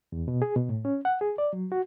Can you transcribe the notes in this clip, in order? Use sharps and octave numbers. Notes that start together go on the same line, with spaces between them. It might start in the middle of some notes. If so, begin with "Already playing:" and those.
E2
B2
G#4
B2
A2
C#4
F#5
G#4
D5
F#3
F#4